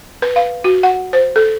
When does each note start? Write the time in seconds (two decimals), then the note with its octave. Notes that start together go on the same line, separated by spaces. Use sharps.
0.22 B4
0.36 F5
0.64 F#4
0.83 F#5
1.13 C5
1.36 A4